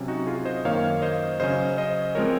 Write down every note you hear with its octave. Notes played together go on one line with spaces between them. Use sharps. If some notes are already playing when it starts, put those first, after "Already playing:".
Already playing: C3 F#3 C#4
D#4 F#4
F4 G#4
C5 D#5
F#2 D#3 A#3 C#5 F5
C5 D#5
C#3 F#3 C#4 C5 D#5
C5 D#5
F3 G#3 C4 A#4 C#5